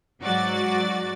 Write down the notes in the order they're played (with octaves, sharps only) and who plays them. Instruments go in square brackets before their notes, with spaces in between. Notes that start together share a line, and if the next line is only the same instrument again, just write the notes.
[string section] G#2 F#3 F#4 D5 A6